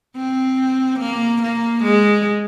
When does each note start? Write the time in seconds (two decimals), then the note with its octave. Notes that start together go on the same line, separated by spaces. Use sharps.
0.16 C4
1.00 A#3
1.42 A#3
1.83 G#3